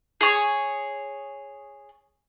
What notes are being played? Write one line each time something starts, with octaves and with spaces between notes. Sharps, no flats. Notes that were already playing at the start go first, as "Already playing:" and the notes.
G#4 C#5